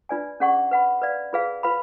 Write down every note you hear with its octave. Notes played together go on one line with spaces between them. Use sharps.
D4 F4 B4 D5 G#5
C#4 G#4 D5 F#5 C#6
B4 F#5 B5
B4 D5 F5
F4 G#4 B4 F5
F4 B4 F5 B5